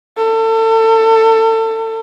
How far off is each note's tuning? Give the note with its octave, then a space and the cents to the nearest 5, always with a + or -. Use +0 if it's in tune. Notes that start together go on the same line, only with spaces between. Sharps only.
A4 +30